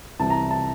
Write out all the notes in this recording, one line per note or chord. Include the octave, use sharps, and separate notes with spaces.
C2 C3 E3 A5
A#5
A5